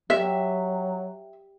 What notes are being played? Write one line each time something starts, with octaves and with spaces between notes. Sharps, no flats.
F#3 G4 E5